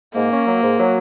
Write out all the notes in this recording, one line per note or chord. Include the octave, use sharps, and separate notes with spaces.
G#2 A#3
C#4
F#3
G#2
F#3